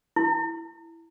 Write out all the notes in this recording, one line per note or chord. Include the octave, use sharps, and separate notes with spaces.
E4